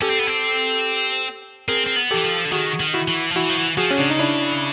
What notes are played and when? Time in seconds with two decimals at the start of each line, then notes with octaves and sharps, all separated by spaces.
0.02 C#4 G4 A4
0.10 C4
0.19 B3
0.27 C4
1.68 C4 G#4 A#4
1.87 C4
1.96 B3
2.11 E3 G4 A4
2.24 F3
2.45 D3
2.52 D#3 F#4 G#4
2.80 D#3
2.94 E4 F#4
3.08 E3
3.30 F3
3.36 E3 E4 F#4
3.49 F3
3.57 E3
3.77 F3 F#4 G#4
3.91 D3 C#4
3.98 C#3 D4
4.10 D#4
4.19 D4 E4